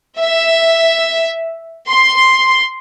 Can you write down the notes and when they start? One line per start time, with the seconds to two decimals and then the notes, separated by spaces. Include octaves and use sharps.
0.18 E5
1.89 C6